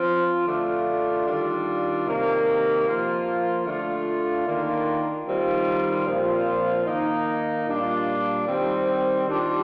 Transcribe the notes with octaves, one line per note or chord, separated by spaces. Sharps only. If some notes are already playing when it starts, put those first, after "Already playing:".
Already playing: F3 C4 F4
D3 A3 D4 F4
D#3 G3 D4 F4
C3 D#3 A#3
F3 A#3 F4
D3 A3 D4 F4
D#3 A#3 D4 F4
D#3 G3 C4 F4
A#2 F3 C4 F4
D#3 A#3 D#4
A#2 G3 D4 F4
D#3 G3 C4
D#3 G3 D4 F4